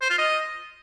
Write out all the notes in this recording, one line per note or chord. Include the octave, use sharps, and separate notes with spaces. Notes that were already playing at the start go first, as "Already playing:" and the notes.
C5
F4
D#5